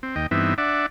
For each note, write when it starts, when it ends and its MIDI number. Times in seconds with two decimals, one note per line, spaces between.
0.03 0.15 60
0.16 0.27 39
0.16 0.27 75
0.16 0.27 79
0.31 0.54 43
0.31 0.54 52
0.31 0.54 59
0.31 0.54 60
0.31 0.54 63
0.31 0.54 76
0.58 0.86 62
0.58 0.86 74
0.58 0.86 76
0.58 0.86 78